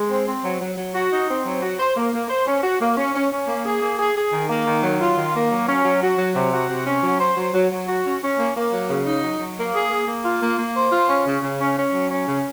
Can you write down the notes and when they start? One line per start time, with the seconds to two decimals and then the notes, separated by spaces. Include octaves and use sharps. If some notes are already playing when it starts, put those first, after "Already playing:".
Already playing: G#3
0.10 C4
0.27 C4
0.44 F#3
0.61 F#3
0.77 F#3
0.95 F#4
1.12 D#4
1.28 C4
1.45 F#3
1.62 F#4
1.79 C5
1.97 A#3
2.14 A#3
2.30 C5
2.47 C#4
2.63 F#4
2.81 A#3
2.97 C#4
3.14 C#4
3.32 C#4
3.48 A#3
3.65 G#4
3.82 A#3
3.99 G#4
4.16 G#4
4.33 D#3
4.49 A#3
4.67 D#3
4.83 F#3
5.01 F4
5.17 D#3
5.35 A#3
5.52 F#3
5.68 C#4
5.85 F#3
6.02 F#4
6.18 F#3
6.36 C3
6.53 F#4
6.70 C3
6.86 C#4
7.03 F#3
7.20 C5
7.37 F#3
7.54 F#3
7.71 F#3
7.87 F#4
8.05 C#4
8.22 C#4
8.39 A#3
8.56 A#3
8.72 F#3
8.89 C#3
9.06 D#4
9.23 F#3
9.40 F#3
9.58 A#3
9.74 G#4
9.90 A#3
10.08 A#3
10.24 F4
10.42 A#3
10.59 A#3
10.75 C5
10.92 F4
11.09 C#4
11.26 C#3
11.43 C#3
11.59 C#4
11.77 C#4
11.94 F#3
12.10 C#4
12.28 C#3